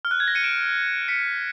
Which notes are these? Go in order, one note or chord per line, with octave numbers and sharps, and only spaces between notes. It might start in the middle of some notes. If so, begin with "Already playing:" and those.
F6
F#6
G#6
A#6
C#7 D#7
D7 E7
D7
B6 C#7